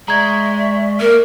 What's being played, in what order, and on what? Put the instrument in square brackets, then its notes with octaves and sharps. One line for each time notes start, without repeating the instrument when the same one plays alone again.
[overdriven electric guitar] G#3 [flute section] D5 E5 C#6 [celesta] A#5 G#6
[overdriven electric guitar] A#3 [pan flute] A#4